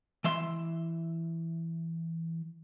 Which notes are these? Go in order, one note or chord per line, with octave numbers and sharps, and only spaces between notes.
E3 E5 C6